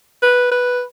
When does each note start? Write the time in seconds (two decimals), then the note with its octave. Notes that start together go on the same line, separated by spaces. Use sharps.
0.22 B4
0.51 B4